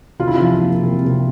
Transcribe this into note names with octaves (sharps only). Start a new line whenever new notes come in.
C3 F4
E4
F3 F4
A#3
C3
C3